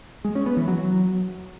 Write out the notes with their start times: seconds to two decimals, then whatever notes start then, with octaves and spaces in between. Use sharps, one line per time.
0.25 G#3
0.35 C#4
0.46 B3
0.57 E3
0.68 F#3